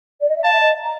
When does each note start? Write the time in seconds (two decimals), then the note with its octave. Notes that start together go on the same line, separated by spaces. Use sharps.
0.21 D5
0.29 D#5
0.36 E5
0.43 F5 A5
0.52 E5
0.61 D#5
0.80 A#5